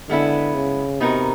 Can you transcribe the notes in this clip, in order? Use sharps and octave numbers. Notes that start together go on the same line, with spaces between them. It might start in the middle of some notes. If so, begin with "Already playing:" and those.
D3 G#3 B3 E4
C#3
C3 B3 D#4 F#4 A#4